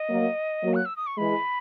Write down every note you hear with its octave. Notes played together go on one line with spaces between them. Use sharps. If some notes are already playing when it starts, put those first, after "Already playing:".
Already playing: D#5
F#3 A#3
F#3 A#3
F#6
E6
D#6
C#6
E3 G#3 B5